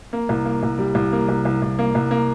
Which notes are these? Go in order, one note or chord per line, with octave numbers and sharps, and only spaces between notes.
A#3
C2
A#3
C2
G3
C2
A#3
C2
C2
C2
A#3
C2
A#3